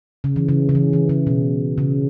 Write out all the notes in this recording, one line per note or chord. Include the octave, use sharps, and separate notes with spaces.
C#3
E3
C#3
C#3
E3
E3
C#3
B2
C#3